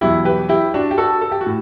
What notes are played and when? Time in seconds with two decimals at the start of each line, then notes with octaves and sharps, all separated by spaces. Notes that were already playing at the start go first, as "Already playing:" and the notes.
0.01 E2 B2 F#3 E4 G4
0.25 G4 B4
0.49 E4 G4
0.74 D4 F#4
0.91 G4
0.98 F#4 A4
1.21 A4
1.32 G4
1.41 F#4
1.46 A2